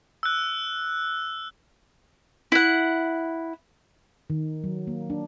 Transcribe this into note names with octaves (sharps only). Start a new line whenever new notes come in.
E6 F#6
E4 F#5
D#3
F#3
A#3
D4